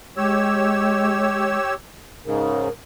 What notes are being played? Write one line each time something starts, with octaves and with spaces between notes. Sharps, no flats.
G#3 G4 C#5 E6
G#2 C#3 A#4